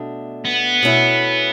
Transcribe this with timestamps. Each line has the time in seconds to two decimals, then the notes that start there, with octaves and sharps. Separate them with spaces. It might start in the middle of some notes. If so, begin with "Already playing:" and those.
Already playing: B2 A3 D4
0.45 B3
0.83 B2 A3 C#4 E4